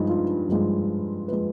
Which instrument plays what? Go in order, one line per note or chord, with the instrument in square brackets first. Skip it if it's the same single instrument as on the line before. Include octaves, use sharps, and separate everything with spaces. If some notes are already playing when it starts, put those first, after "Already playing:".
Already playing: [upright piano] G2 F3 G#3 D4 D#4
F4
G2 F3 G#3
F3 G#3 B4